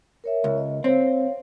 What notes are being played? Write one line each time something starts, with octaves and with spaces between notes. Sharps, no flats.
A#4 C#5 E5
C#2
D#5
C4 C#5 F5